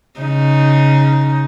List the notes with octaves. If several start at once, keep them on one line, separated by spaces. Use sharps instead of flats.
C#3 D#4